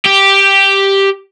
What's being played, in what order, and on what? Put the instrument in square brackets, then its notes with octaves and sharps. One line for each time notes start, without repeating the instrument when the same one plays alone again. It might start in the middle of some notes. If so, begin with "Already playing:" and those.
[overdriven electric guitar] G4